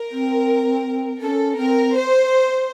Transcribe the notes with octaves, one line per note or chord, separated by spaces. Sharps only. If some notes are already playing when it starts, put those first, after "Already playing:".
Already playing: A#4
C4
C#4 A4
C4 A#4
C5